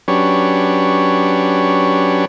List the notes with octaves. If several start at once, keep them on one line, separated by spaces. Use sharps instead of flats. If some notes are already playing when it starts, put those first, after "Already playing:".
F#3 C#4 D4 G4 B4 C#5